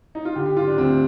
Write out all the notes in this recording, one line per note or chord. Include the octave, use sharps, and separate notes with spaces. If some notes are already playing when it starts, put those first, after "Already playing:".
D#4
F4
D3 G4
G4
D3 F4
D4
D2 C4